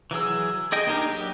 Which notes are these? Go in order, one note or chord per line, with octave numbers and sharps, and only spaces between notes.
E3 F#3 G#4 E6
G#4 D#5 G5 G#5
A#3 D4 D#4 G4 A#4
F#3 G4